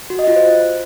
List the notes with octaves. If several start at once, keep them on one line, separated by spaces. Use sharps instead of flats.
F#4
D#5
F4
C5